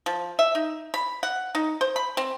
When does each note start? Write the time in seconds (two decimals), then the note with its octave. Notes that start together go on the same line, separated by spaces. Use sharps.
0.06 F3
0.39 E5
0.55 D#4
0.94 B5
1.23 F#5
1.55 D#4
1.81 C5
1.96 B5
2.17 C4